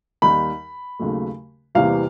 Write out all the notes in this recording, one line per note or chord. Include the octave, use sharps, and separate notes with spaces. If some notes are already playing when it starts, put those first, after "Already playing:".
D#2 D#3 G3 B5
D#2 C#3 F#3 A3
E2 C3 E3 G3 A#3 F5